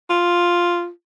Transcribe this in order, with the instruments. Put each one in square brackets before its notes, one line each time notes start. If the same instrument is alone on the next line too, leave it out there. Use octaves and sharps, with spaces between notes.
[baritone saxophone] F4